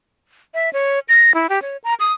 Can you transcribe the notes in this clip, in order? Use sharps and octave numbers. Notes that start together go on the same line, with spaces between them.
E5
C#5
A#6
E4
G4
C#5
A#5
D#6